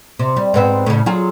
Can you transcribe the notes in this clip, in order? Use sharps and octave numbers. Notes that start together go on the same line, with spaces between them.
C3
G3
G#2 B3 C4
A2 C#3
F#3 F4 G#4